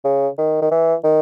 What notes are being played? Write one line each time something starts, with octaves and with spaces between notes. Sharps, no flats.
C#3
D#3
D#3
E3
D#3